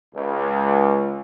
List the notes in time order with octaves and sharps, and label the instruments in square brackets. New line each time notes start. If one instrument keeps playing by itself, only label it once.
[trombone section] C#2